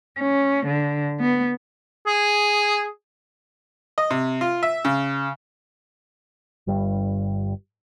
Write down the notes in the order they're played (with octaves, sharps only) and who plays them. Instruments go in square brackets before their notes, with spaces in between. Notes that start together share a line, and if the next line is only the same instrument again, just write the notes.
[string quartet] C#4
D3
B3
[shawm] G#4
[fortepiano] D#5
C3
F4
E5
C#3
[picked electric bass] G1 G2 G3